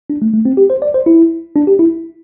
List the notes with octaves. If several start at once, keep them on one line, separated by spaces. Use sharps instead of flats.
D4
A3
A3
C4
G4
C5
D5
C5
E4
D4
G4
E4